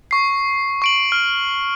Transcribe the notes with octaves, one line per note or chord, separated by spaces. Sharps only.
C#6 C7
C#6 D7 F#7
F6